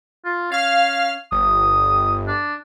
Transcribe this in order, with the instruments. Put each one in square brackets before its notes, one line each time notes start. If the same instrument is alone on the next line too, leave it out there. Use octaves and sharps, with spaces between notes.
[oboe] F4
[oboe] C#4 [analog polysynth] F5 F6
[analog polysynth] G1 [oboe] D#6
[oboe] D4